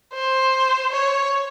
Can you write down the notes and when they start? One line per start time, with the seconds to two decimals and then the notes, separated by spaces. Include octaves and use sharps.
0.14 C5
0.92 C#5